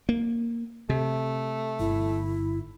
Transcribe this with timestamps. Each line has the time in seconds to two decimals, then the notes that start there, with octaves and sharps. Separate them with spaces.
0.09 A#3
0.89 C3 A3
1.79 G1 E4